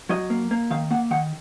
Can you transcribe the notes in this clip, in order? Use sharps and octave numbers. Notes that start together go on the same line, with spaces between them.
F#3 D#5
A#3
A#3
D#3 F5
A#3 F#5
D#3 F#5